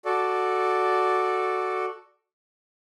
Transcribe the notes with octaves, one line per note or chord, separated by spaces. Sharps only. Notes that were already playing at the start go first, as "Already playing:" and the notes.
F#4 A4 D5